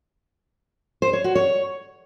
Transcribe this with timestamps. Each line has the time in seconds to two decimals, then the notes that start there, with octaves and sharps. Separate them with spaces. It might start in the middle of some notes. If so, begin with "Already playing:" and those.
1.02 C5
1.13 C#5
1.24 F#4
1.35 C#5